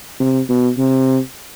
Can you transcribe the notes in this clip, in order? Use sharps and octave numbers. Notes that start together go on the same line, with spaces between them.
C3
B2
C3